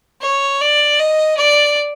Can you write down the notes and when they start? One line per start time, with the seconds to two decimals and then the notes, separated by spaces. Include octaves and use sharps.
0.21 C#5
0.61 D5
0.99 D#5
1.37 D5